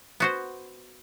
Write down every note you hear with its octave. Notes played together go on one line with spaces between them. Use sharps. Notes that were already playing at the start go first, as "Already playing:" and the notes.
B3 F#4 C5